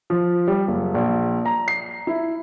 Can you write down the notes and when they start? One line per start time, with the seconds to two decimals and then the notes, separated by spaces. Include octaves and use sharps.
0.10 F3
0.48 G3
0.68 F#1
0.94 A#1
1.45 A#5
1.68 C7
2.07 E4